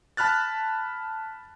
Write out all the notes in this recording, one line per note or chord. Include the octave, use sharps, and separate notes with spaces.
A5 B5 F6 F#6 A6